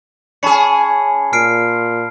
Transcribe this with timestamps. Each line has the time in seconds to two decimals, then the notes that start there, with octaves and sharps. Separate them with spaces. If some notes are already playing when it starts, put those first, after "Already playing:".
0.43 C#4 G#4 A5 B5 C#7
1.33 A#2 F6 C7 D7